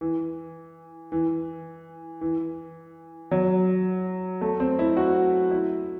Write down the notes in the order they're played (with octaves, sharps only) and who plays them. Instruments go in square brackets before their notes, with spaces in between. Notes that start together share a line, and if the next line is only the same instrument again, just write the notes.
[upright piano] E3
E3
E3
F#3
A3
C4
E4
F#4
E4